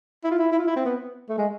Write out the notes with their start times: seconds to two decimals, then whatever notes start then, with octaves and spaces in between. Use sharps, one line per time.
0.24 E4
0.31 F4
0.39 E4
0.52 E4
0.59 F4
0.67 E4
0.76 C4
0.85 B3
1.29 A3
1.38 G#3